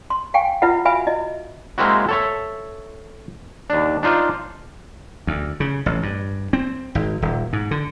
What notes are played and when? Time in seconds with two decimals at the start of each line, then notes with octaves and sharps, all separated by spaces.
0.10 C6
0.34 F5 G5 G#5 C#6
0.62 E4 F4 B4 E5 F#5
0.85 F#4 B4 E5 F5 G#5 B5
1.07 E4 D#5
1.78 G#3 A#3 C4 E4 F#4
2.09 A4 C#5 E5
3.70 D#2 D4
4.03 D4 D#4 F4 C5 D5
5.27 D2
5.60 C#3
5.86 A1
6.03 G2
6.53 C4
6.95 G#1
7.22 D#1
7.53 G#2
7.71 D3